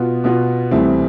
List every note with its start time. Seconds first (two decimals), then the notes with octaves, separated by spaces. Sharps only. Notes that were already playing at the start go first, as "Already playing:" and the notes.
Already playing: B2 B3 F4
0.24 B2 B3 F4
0.71 C2 C3 E3 A3 C4